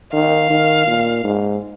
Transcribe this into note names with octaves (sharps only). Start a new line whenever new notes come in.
D#3 F5
D#3
A#2
G#2